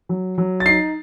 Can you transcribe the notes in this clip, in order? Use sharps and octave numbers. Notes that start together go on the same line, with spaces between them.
F#3
F#3
A6
D#4 C7